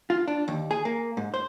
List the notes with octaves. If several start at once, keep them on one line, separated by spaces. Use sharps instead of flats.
F4
D4
D#2
G#4
A#3
G#2
C5